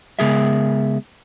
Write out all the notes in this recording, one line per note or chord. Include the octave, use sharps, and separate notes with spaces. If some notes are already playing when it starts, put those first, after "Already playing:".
C#3 G#3 B3 G#4 A#4 E5